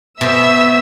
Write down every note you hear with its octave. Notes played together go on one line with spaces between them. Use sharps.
B2 B3 C5 E5 E6